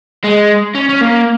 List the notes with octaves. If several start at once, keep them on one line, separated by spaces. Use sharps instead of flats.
G#3
C#4
C#4
A#3